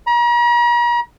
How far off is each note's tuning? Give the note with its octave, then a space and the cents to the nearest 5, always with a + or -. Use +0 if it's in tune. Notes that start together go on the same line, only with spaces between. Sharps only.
A#5 +40